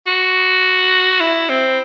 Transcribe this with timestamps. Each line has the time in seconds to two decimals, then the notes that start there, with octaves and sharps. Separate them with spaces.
0.07 F#4
1.21 E4
1.49 C4